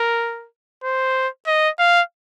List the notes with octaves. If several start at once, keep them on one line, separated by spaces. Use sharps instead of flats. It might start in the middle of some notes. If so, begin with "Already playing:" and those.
Already playing: A#4
C5
D#5
F5